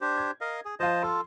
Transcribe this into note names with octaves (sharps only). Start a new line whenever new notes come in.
D4 G4 C5
G#6
A#4 D#5 F5
G#4
F3 F4 C5 D#5 A5
F4 A4 C6